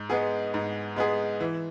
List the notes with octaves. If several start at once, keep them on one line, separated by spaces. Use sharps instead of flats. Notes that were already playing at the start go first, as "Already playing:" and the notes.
Already playing: G#2
G#3 B3 G#4
G#2
G#3 B3 G#4
E3